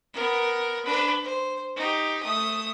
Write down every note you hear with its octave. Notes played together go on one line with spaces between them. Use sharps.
B3 A#4
D4 B4
C5
D#4 G4
A3 D#6